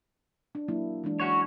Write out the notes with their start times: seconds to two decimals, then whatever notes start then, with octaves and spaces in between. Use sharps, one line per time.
0.55 D4
0.68 F#3 A#3 E4
1.04 E3 G#3 D4
1.20 C#4 F#4 C#5